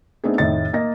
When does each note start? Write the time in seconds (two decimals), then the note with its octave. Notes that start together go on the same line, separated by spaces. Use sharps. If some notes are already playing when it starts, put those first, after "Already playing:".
0.24 A3 B3 C4 D4 D#4 G#4
0.38 F1 A2 D#3 D#5 A6
0.73 A#3 D#5 A#6